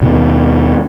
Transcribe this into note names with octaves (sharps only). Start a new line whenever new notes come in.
D#2 B2 D#3